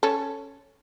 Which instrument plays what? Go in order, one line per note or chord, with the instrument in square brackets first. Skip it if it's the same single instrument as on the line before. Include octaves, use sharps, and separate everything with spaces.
[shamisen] C#4 A4